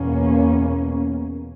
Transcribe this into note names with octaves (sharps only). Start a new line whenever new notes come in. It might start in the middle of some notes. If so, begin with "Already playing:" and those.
Already playing: E2 B2 A#3 C#4